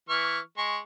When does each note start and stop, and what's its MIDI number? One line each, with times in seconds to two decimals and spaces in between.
0.09 0.39 52
0.09 0.39 85
0.09 0.39 89
0.58 0.78 56
0.58 0.78 85